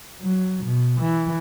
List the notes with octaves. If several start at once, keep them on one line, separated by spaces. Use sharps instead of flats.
F#3
B2
E3